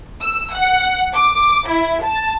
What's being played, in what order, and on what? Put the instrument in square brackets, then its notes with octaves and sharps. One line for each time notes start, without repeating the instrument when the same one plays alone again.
[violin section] E6
F#5
D6
E4
A5